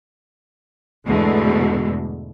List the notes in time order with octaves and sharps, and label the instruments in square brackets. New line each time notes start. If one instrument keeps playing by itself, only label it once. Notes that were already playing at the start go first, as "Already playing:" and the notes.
[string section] E2 G#2 B2 D3 G#3 A3